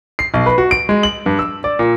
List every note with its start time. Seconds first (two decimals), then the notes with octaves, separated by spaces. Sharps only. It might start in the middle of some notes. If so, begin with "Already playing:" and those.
0.19 C7
0.34 B1
0.46 B4
0.58 F#4
0.71 D7
0.89 G#3
1.03 F#7
1.26 G2
1.39 E6
1.64 D5
1.79 A#2